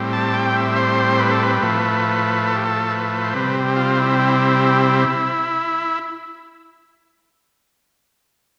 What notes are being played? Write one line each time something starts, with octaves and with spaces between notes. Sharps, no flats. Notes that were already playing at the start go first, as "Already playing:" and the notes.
Already playing: A2 G3 C4
A5
G5
E5
C5
B4
A4
B4
A2 F3 A3
A4
G4
A4
B4
C5
C3 G3 C4 B4
F4
E4
E4